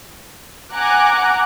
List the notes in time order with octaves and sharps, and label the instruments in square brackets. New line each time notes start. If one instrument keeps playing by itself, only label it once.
[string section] F#5 G#5 A#5 D6 F#6